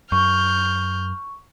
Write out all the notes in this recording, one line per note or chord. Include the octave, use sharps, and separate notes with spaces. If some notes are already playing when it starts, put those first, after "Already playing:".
F#2 C#6 F6 G6